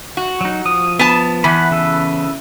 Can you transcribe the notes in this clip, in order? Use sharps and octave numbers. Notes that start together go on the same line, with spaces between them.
F#4
F#3 D#4
F3 D#6
B3 A5
E2 F#5 A5 B5
C#3 A4 B4